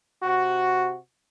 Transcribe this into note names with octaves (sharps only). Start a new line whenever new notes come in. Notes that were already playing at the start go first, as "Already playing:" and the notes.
C3 F#4